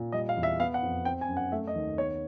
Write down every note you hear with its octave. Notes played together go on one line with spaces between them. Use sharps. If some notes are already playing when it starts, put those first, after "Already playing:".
Already playing: A#2
G3 D#5
F5
E2
E5
B3 F5
F#5
F2
C4 G5
G#5
F#2
F#5
A3 E5
D#5
D#2
B3 C#5